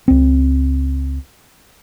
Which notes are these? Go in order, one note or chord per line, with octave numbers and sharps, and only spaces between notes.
C#2 C4